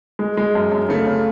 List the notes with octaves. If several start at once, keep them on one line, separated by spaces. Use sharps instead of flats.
G#3
G#3
F#2
F#2
C#3 A3
C#3